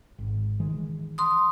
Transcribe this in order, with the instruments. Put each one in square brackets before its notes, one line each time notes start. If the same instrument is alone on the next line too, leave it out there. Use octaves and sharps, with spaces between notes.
[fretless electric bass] G#1
D#3 E3 G#3
[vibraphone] C6 D#6